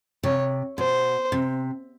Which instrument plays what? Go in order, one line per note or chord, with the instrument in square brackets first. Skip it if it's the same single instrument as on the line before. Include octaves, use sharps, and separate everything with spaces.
[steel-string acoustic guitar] C3 [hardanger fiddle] C#5
[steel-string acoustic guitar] B2 [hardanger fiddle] C5
[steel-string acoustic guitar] C3